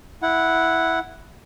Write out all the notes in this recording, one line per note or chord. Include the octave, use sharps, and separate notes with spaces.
E4 F#5